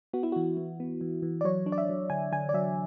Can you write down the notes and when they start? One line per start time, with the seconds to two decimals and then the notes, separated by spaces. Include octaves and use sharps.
0.13 B3 F#4
0.23 E4
0.32 E3 F#4
0.57 E3
0.80 B3
1.01 E3
1.23 E3
1.41 D5
1.44 F#3 C#5
1.66 D4
1.72 D5
1.78 E5
1.89 F#3
2.10 D3 G#5
2.32 D3 G#5
2.49 D5
2.54 F#3 E5